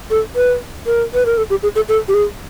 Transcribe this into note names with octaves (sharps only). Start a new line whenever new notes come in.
A4
B4
A#4
B4
A#4
A4
G4
G#4
A4
A4
G4
G#4